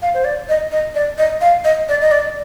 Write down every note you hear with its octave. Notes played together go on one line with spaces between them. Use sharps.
F5
C5
D5
D#5
D#5
D5
D#5
F5
D#5
D5
D#5
D5